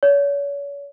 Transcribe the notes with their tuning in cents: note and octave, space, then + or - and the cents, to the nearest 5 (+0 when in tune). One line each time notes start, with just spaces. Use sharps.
C#5 +35